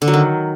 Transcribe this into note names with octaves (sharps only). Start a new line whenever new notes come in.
D3
F#3
D#3